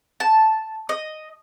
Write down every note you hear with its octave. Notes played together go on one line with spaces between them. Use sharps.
A5
D#5